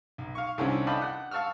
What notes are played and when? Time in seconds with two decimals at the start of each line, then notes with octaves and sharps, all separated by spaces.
0.18 B1
0.35 F5 C#6
0.58 C2 D3 D#3 C4 C#4 E4
0.87 D5 D#5 F5 G5 A5 B5
1.02 F#5 F#6
1.31 F5 A5 C#6 E6 F6